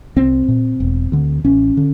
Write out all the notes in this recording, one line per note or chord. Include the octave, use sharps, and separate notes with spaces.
C2 C4
A#2
E1
D2 D3
A1 C#4
D3